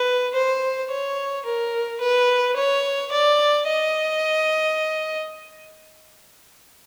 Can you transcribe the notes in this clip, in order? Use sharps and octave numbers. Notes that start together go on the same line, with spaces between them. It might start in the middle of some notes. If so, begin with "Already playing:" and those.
Already playing: B4
C5
C#5
A#4
B4
C#5
D5
D#5